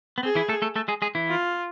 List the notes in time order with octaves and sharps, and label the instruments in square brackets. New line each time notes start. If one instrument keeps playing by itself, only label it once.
[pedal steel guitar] B3
[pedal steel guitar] C4 [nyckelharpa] G#4
[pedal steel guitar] E3 E4
A3 A4
A3 A4
A3 A4
G#3 G#4
G#3 G#4
E3 E4
[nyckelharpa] F4